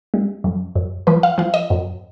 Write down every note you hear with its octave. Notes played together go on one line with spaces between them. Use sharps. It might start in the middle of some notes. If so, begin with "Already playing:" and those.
G#3
F#2
F#2
F3 B4
F5
F3 F5
D#5
F#2